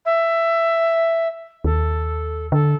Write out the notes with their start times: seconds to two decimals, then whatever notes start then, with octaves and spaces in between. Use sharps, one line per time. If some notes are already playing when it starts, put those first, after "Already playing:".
0.05 E5
1.64 D#2 A4
2.52 D3 A4